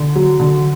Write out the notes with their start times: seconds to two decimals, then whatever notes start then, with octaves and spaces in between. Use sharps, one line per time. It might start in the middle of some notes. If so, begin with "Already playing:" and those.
Already playing: D3
0.16 F#3
0.40 D3